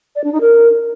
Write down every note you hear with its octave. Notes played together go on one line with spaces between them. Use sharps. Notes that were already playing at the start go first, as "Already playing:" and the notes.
D5
D4
D#4
A#4